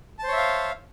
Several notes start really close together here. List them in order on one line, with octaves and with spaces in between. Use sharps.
A5 C5 C#5 E5 F5